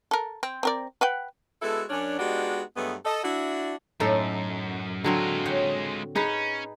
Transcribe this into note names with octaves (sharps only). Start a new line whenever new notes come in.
A4 A#4
C4
C4 A#4 D5
B4 F#5 G5
G#3 B3 E4 F#4 A4
F#2 C#4 D4
G#3 B3 D4 D#4 F#4 G4
G2 F#3 G#3 A3 B3
A4 D#5
D4 E4 F#4
F#2 A2 D#4 A4
D3 F#3 G#3 C4 F4
C#5 F#5 G5
C#4 D#4 G#4 B4